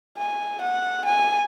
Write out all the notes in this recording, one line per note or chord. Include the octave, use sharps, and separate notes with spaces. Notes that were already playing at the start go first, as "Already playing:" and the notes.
G#5
F#5
G#5